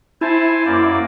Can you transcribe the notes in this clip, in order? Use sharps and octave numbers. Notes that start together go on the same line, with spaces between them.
E4 C5 G#5 A5
F#2 A#3 D5